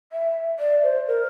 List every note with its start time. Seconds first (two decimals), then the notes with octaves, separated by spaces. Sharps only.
0.12 E5
0.59 D5
0.83 C5
1.08 A#4